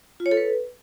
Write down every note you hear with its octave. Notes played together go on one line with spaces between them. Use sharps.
F4
C#5
A4
B4